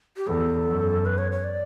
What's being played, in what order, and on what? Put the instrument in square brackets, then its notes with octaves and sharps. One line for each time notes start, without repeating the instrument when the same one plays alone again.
[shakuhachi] G4
[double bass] E2 [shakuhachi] A4
[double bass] F#2
[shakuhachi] B4
C#5
C#5
D5